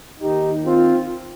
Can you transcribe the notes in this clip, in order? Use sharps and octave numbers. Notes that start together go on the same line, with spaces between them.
D#2 D#3 D#4 G4
C4 F4